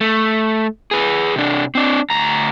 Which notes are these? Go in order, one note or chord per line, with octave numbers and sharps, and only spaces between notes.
A3
G#4 B4
C3 D4
C4 D4
D2 A#5